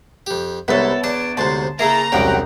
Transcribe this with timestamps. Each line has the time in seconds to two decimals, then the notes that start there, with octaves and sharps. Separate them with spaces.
0.27 F2 G4
0.68 C2 G#2 B3 E4 A4 C#5
1.04 E2 D4 A5
1.37 D2 G#2 C3 A5 C6
1.79 C#3 A#3 E4 G#4 A4 A#5
2.12 E1 C2 G#2 F#3 C#4 G4 F#5 G5